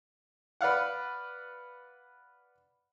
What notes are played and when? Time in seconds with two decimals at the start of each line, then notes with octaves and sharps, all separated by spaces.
0.61 B4 D5 F5 F#5